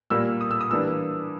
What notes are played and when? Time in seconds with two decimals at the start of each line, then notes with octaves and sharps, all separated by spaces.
0.10 A#2 G3 A#3 E6
0.41 D#6
0.51 E6
0.61 D#6
0.71 E3 G3 A#3 D4 E6